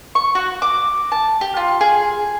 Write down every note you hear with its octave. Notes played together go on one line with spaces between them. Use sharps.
C#6
F#4
D6
A5
G4
F4
G#4